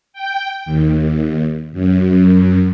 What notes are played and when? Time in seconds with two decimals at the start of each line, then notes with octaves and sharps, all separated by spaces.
0.13 G5
0.65 D#2
1.72 F#2